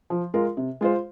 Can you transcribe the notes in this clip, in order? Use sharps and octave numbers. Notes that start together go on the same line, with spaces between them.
F3
G#3 F4 A#4
C3
G#3 F4 C5